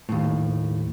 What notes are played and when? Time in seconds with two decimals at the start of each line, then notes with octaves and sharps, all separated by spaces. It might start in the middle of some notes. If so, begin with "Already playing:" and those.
0.09 D#2 A2